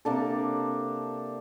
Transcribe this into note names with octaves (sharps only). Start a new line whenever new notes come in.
C3 A#3 D4 A4